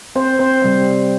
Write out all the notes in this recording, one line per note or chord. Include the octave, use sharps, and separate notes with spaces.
C4 C5
C4 C5
C3 G3 C4